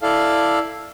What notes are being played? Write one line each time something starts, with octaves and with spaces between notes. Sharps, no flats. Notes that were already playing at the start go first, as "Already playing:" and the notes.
E4 A4 D5 F5